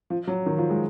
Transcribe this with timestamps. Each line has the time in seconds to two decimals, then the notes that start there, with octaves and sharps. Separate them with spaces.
0.10 F3
0.27 F#3
0.46 D#3
0.58 F3
0.70 G#3